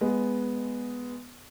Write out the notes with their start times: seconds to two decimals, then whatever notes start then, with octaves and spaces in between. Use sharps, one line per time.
0.01 G#3 B3